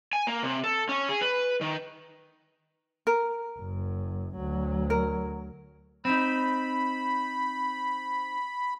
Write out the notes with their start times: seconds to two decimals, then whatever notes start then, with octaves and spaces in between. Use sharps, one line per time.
0.13 G#5
0.27 A#3
0.43 C3
0.64 A4
0.89 C#4
1.09 G#4
1.21 B4
1.61 D#3
3.07 A#4
3.59 F#1 F#2
4.36 D2 F#3
4.90 A#4
6.05 C4 D#4 B5